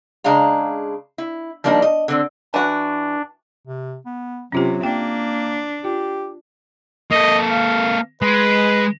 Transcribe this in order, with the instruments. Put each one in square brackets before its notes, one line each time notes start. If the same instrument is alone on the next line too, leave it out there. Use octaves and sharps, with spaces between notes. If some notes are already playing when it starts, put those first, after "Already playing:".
[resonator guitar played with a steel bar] C#3 G#3 D4 F5 A#5
E4
F3 G3 A#3 D4 D#4
D#5
D3 C4
[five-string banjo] E3 F#4 [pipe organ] D4
[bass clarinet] C3
B3
[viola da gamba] C3 [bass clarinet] F#3 [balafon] C#4 F4 G4
[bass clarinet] A#3 [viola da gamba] D4 [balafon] G5
[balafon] F4 [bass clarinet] G4
[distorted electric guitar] A#3 A4 [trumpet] D#5
[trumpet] F5
[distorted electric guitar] G#3 [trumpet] B4